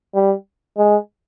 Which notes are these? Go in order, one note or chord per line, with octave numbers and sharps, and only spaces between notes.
G3
G#3